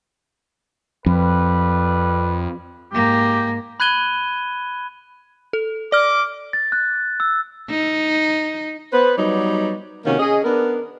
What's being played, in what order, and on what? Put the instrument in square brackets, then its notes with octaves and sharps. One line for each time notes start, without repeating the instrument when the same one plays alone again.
[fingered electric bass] F2 [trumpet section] G3 B4
[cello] G#2 A#3 [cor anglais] G4
[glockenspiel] B5 F#6 G#6 D#7 G7
[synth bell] A4
[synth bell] D5 F6 [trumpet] D6
[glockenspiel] A6
F#6
E6
[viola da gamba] D#4
[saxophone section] B3 B4 C5
F#3 G3 B3 D#4 C#5 D5
C3 D#3 A#3 C#4 F#4 A#4
C#4 G#4 D#5
B3 D4 A#4